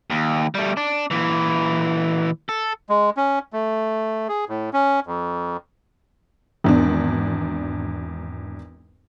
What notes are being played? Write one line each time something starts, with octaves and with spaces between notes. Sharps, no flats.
D#2
G3 A3
D4
A#2 E3
A4
G#3
C#4
A3
G#4
A2
C#4
F2
G#1 E2 D4